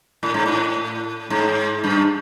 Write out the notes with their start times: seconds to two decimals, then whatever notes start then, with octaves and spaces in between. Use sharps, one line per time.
0.23 A2
0.34 G#2
0.46 A2
1.30 G#2
1.84 G2